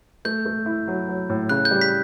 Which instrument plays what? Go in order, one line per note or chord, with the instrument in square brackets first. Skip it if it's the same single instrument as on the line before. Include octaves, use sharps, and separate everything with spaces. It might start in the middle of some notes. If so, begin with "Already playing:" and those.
[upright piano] A3 [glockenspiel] G6
[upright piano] A3
E4
F#3
F#3
A2
[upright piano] C#3 [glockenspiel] F#6
[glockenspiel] G6
[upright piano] G3
[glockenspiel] B6